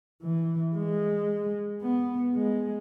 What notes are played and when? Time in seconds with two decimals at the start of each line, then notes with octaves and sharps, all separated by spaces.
0.23 E3
0.76 G#3
1.83 B3
2.35 G#3